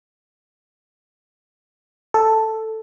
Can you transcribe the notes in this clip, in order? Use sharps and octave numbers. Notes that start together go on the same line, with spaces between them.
A4